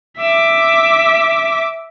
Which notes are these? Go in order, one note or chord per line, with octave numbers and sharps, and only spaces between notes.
E5 D6